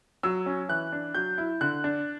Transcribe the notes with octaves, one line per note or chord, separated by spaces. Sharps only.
F#3 E6
C#4
E3 F#6
D4
F#3 G6
E4
D3 F#6
D4